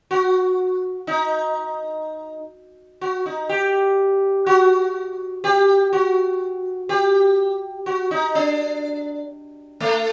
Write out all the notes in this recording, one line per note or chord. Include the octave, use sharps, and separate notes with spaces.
F#4
D#4
F#4
D#4
G4
F#4
G4
F#4
G4
F#4
D#4
D4
A3